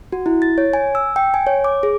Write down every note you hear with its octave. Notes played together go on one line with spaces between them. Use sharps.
F#4
E4
A6
C#5
G#5
E6
G5
G#5
C#5
D6
G#4